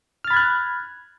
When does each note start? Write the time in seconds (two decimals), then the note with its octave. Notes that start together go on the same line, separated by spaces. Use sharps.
0.24 F6
0.27 A6
0.31 B5
0.34 G#6
0.37 F#6